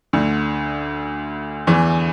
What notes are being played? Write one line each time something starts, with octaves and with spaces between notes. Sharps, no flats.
D2 D3
E2 E3